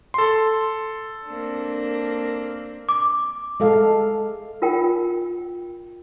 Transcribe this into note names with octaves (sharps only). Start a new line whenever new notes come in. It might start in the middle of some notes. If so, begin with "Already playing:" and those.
A4 C6
A#3 C4 D4
D6
G#3 A4 F5
F4 A#4 G5